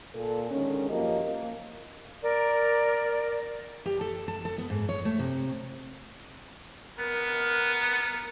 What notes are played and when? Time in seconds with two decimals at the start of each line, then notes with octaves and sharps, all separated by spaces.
0.15 A#2 A4
0.50 D3 D#3 G#3 C#4
0.89 F#2 F3 A#3 G4 A#4 D#5
1.24 A#3
2.23 A#4 D5
3.86 G4
4.01 A4
4.28 A5
4.45 A4
4.58 B3
4.70 G#2
4.89 C#5
5.05 A3
5.19 C3
7.00 B3 A#4